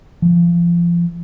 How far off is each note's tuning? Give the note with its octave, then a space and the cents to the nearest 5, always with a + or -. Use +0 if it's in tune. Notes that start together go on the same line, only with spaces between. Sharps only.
F3 -25